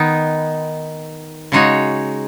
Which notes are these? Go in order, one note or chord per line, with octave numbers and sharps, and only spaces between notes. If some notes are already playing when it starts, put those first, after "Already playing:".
Already playing: D#3 B3 D#4
C#3 G#3 D#4 F#4 C#5